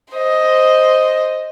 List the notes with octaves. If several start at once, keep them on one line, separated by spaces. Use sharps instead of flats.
C5 D#5